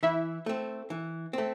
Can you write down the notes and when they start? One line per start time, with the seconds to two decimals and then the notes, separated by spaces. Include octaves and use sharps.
0.03 E3 E4 E5
0.46 A3 C4
0.90 E3
1.33 A3 C4